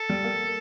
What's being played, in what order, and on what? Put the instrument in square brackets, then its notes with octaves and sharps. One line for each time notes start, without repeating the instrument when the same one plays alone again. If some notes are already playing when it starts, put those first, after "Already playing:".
Already playing: [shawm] A4
[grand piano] G3
A#3